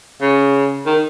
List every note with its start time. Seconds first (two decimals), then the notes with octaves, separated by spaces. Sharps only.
0.21 C#3
0.86 D#3